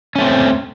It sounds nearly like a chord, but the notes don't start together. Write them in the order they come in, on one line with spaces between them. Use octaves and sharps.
C#4 A3 C4